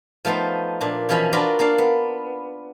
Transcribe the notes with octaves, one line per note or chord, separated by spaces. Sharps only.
F3 A3 B3 D#4 C5
A#2 D4
B2 E3 F3 C#4 D#5 B5
D4 F4 F#4 A#4 B4 D5
A#3 D4 D5 F5
B3